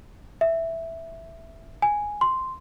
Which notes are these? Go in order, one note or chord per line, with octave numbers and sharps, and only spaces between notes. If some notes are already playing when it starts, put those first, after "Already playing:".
E5
G#5
C6